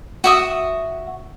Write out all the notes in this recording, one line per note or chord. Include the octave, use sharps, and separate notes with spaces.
F#4 E5 D#6